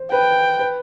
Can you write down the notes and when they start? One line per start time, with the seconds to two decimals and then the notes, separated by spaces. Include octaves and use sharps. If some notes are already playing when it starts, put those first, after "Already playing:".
Already playing: C5
0.11 B4 G5
0.59 B4